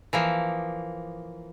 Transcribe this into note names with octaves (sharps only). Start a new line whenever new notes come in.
E3 F3 A#3